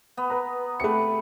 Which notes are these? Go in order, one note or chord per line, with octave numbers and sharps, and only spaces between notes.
B3
B4 A#5
C3 A3 B4 C#7